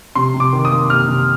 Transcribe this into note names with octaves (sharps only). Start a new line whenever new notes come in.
C3 C6
C3
D6
D#3
D#6
A#3
C3 F6
C3